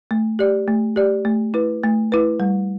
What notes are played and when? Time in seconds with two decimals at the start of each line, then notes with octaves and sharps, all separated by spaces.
0.11 A3
0.39 G4 D5
0.68 A3
0.96 G4 D5
1.25 A3
1.54 E4 B4
1.83 A3
2.12 E4 B4
2.40 G3